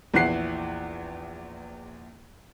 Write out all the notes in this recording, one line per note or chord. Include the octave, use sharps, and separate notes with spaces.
A#1 E2 E3 F#5 F#6 C7